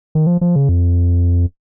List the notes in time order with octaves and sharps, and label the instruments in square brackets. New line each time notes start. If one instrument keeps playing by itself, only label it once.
[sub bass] D#3
F3
F3
C#3
F2